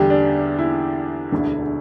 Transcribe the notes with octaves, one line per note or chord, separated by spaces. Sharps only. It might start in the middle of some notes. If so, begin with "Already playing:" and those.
Already playing: E2 D3 G3 G4
D4
E4
E1 D2 D3